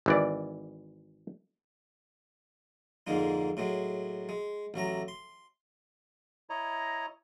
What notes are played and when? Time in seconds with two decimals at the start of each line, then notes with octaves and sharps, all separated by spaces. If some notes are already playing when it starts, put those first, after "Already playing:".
0.06 G#1 E3 D5
3.07 F2 G#2 D3 G#3 A#3 D#4
3.57 A2 F#3 G#3
4.29 G#3
4.74 A1 F#3 A3 A#5
5.08 C6
6.50 E4 C#5 D#5 A#5